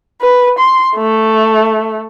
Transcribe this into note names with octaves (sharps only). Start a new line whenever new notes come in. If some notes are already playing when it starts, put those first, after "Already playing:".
B4
C6
A3